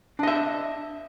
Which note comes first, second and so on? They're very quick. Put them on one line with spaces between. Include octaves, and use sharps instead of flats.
D4 D#5 E5